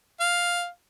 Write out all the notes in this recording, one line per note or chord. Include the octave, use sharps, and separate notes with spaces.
F5